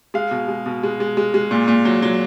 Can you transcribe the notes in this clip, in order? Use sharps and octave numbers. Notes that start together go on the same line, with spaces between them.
G#3 F5
B2
G#3
B2
G#3
G#3
G#3
G#3
A#2
A#2
F#3
F#3